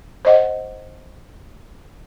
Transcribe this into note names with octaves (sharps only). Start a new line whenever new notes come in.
C5 D#5 F#5